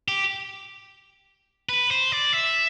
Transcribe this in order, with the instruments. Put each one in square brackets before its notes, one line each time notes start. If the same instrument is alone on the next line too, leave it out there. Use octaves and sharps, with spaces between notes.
[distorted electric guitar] G4
B4
C5
D5
E5